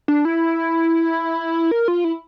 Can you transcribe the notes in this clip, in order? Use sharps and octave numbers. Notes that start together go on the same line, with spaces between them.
D4
E4
A#4
F4
E4